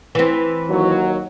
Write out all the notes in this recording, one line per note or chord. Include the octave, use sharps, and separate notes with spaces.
E3 C4
D#2 F#3